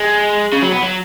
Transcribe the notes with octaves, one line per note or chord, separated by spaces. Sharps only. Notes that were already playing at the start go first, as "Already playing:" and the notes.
Already playing: G#3
C#3
F#3
B3
F#3